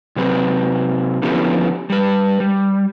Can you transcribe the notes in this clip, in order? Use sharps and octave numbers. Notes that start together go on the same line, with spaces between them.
C3 F#3 C4 B4
D3 F3 B3 C#4 E4 G4
G3 B4
G3